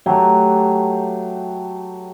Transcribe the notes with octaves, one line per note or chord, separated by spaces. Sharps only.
F#3 A3 G4 G#5